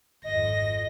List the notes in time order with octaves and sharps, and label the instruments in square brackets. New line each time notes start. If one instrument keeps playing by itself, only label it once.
[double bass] G#1 F2 [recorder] D#5 [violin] A#6